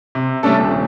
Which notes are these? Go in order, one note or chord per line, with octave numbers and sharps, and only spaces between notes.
C3
G3 A3 C#4 D4 A4
D#1